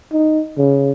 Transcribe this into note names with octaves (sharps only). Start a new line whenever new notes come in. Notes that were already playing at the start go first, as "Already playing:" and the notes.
D#4
C#3